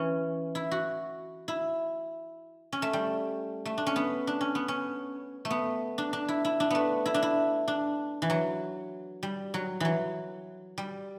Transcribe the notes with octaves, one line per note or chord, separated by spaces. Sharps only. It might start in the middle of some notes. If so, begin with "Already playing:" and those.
Already playing: E3 C#4
E4
F#4
E4
C#4
A3
G3
A3
D4
C#4
B3
D4
C#4
B3
C#4
A3
B3
D4
D4
E4
E4
D4
A3 B3
E4
D4
E4
D4
E3
F#3
G3
F#3
E3 F#3
G3